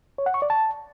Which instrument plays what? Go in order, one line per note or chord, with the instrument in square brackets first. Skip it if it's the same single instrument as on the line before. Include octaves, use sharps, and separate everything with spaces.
[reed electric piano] C#5
F#5
C#6
D5
A5